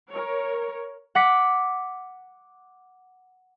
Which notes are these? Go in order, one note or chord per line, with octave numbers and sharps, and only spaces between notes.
A#4 C#5
F#5 D6 B6